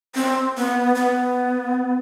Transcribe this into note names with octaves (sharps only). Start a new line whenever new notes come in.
C4
B3
B3